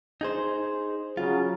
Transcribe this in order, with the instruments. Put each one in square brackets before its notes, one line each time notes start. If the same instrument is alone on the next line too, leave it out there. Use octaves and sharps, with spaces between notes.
[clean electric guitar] D#4 G#4 C5
[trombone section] C#3 F#3 [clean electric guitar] F4